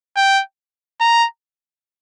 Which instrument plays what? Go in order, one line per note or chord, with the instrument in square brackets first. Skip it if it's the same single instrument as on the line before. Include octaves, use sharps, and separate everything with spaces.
[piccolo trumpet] G5
A#5